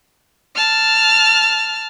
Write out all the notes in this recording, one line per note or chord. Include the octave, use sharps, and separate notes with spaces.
A5 F6